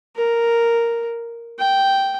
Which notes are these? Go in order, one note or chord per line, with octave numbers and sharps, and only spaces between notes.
A#4
G5